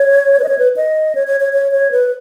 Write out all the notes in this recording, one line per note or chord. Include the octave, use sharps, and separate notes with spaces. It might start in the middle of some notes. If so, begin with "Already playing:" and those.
Already playing: C#5
B4
D#5
C#5
B4
D#5
C#5
C#5
C#5
C#5
C#5
B4